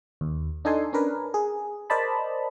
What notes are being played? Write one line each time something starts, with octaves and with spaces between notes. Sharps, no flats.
D#2
D4 D#4 A4 G#5 C6
C#4 D4 A#4 B4
G#4
A#4 C5 D5 D#5 A5 B5